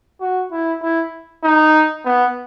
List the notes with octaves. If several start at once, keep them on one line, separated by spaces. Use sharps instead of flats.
F#4
E4
E4
D#4
B3